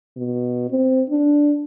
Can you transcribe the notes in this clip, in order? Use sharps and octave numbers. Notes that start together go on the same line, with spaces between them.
B2
C4
D4